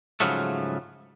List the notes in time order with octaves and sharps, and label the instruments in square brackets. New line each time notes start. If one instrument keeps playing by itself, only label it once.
[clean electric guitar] G#2 C#3 F3 F#3 A3